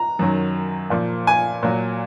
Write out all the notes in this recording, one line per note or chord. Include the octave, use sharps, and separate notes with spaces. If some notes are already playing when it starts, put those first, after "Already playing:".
Already playing: A#5
F#2 D#3 F#3
A#2 F3
G#5
A#2 F#3